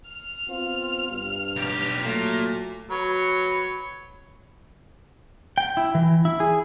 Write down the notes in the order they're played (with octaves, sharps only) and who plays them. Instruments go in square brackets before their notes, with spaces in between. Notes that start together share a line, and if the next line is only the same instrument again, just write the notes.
[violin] F6 F7
[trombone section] B3 C4 F4
G2
[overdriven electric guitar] B1 G4
[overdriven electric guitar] A#2 [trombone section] F#3 A3
[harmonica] F#3 B4 C#5
[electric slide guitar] G5
E4
E3
E4
G#4